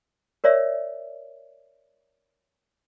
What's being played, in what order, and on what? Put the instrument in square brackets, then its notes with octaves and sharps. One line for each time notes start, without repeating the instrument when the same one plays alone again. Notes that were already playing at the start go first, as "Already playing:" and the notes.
[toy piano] A#4 C#5 D5 E5